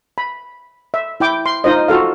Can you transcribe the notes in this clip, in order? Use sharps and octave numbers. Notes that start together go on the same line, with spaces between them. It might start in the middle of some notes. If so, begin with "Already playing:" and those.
B5
E5
E4 G5 D6
C6
D#4 F4 C5 D#5
F4 F#4 A4 F5